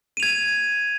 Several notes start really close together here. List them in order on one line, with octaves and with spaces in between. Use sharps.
D#7 F7 G#6